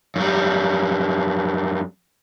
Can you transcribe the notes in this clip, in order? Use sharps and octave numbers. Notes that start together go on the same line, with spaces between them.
F#2 G3